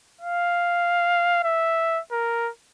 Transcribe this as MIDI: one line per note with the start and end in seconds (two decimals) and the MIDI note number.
0.21 1.43 77
1.44 2.00 76
2.12 2.50 70